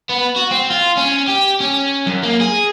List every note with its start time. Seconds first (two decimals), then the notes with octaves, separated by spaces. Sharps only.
0.09 B3
0.36 F#4
0.51 C4
0.70 F4
0.97 C#4
1.28 G4
1.60 C#4
2.06 F#2
2.23 A#3
2.41 G#4